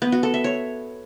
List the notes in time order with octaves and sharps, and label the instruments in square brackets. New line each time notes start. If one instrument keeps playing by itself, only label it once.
[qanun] B3
F#4
A4
E5
C#5